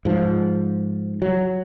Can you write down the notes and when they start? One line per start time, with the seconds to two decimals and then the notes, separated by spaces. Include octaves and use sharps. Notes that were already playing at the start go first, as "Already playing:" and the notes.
0.05 G#2 F3
1.22 F#3